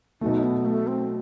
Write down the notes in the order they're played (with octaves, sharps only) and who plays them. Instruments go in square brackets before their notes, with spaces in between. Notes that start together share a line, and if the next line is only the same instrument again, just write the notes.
[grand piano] B2 F#3 A3 [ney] D#4
[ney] B3
A3
C4